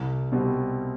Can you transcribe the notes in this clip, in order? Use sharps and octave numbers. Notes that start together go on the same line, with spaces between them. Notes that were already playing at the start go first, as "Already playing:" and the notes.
Already playing: C2
B2 G3 C4